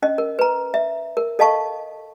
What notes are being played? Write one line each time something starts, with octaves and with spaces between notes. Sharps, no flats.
C#4 D#5
A#4
B4 A#5
E5
A#4
A4 D#5 F5 A5 C#6